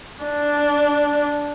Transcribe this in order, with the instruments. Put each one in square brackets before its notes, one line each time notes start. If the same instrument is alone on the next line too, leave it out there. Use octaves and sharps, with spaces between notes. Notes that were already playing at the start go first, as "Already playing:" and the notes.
[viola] D4